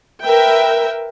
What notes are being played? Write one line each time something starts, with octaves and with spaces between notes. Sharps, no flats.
A#4 B4 E5 G5